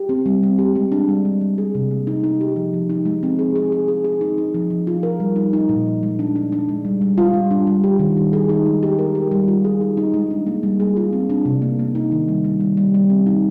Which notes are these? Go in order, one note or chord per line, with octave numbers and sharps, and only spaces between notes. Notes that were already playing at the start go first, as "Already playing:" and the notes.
Already playing: G4
C4
G3
C4
G4
G#3
D4
G3
G3
G3
G#4
C3
A#3
D#4
D#4
G4
F3
F3
D#4
G#3
C4
G#4
G#4
G#4
G#4
G#4
D#4
D#4
F3
F3
F4
A#4
G3
D#4
D#4
A#2
F3
G#3
D4
D4
D4
G#3
G3
G3
F4
G3
D4
G3
G4
D#3
G3
G#4
D#4
G#3
G4
A#4
G4
G3
F4
G#4
D#4
D#4
G#3
D4
A#3
G3
G#4
F4
C4
D4
C3
A#3
A#3
D#4
D#3
G3
G3
G3
G3
G3
C4
D#4